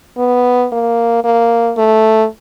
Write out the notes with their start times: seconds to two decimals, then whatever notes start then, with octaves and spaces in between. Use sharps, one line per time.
0.18 B3
0.72 A#3
1.24 A#3
1.78 A3